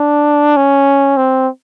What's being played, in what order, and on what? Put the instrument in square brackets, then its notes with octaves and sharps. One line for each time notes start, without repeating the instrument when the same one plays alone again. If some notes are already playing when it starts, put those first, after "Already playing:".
Already playing: [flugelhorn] D4
C#4
C4